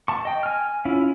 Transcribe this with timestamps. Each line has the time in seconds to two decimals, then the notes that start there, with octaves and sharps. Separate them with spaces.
0.08 A5 C#6
0.25 D#5 G5
0.43 G#5 F6
0.85 C#4 E4 F4